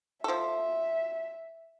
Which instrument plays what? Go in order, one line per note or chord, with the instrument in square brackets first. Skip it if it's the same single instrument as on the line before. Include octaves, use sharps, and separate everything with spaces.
[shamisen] F3 A4 [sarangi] E5